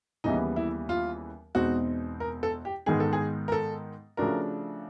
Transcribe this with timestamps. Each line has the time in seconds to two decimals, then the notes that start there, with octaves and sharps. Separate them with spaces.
0.24 D#2 C#3 E3 G3 B3 D#4
0.56 E4
0.89 F4
1.55 E2 B2 G#3 C4 D#4 F#4
2.20 A#4
2.43 A4
2.65 G4
2.86 G#2 D#3 G#3 B3 D#4 G#4
3.00 A4
3.13 G#4
3.48 A#4
3.52 A4
4.17 C#3 F3 A3 D4 F#4 A#4